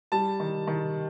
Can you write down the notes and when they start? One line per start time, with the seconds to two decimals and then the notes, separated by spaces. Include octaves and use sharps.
0.12 G3 A5
0.40 D#3
0.67 D#3